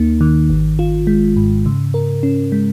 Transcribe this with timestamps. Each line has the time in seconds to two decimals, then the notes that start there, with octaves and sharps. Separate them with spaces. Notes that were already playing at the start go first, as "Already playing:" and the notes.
Already playing: D#2 A#3 D#4
0.21 D#3
0.50 G#1
0.79 F4
1.07 G#3
1.36 G#2
1.66 C#3
1.94 A#4
2.23 C#4
2.52 G#3